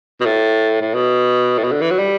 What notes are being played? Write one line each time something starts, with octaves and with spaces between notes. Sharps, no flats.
B2
A2
A2
B2
A2
B2
D3
E3
F#3
G3